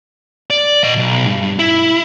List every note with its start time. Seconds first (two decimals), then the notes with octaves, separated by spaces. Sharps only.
0.50 D5
0.84 A#2 D#5
0.98 B1
1.27 G2
1.59 E4